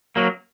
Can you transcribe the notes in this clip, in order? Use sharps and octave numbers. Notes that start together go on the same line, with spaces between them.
F#3 A#3